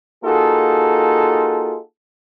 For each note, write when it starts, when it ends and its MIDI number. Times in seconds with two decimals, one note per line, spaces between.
0.24 1.78 58
0.24 1.78 63
0.24 1.78 65
0.24 1.78 66
0.24 1.78 68
0.24 1.78 69